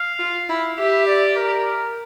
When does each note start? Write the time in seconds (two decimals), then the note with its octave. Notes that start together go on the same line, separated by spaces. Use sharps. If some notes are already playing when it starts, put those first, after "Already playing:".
Already playing: F5
0.19 F4
0.48 E4
0.77 G4 E5
1.07 D5
1.36 A#4